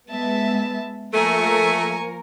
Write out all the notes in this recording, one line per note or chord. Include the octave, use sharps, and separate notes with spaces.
G#3 B3 E5 A5
F3 A3 A#3 A#4 G#5 C#6